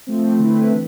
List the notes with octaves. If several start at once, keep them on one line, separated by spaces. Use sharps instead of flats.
F3 A3 C4
D3 A3 C4 E4 B4
E3